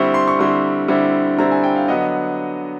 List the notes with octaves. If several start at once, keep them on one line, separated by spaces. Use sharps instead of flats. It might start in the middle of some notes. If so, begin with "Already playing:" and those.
Already playing: D3 G3 C4 E4 C#6
C6
C#6
D3 G3 C4 E4 C6
D3 G3 C4 E4
D3 G3 C4 E4 A#5
G#5
G5
F5
D3 F#3 B3 D#5